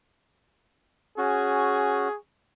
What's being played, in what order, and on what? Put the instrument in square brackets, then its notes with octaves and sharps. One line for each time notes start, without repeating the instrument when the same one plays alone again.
[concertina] C#4 F#4 [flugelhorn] G#4